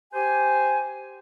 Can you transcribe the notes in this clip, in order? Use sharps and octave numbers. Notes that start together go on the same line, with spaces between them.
G4 C5 G#5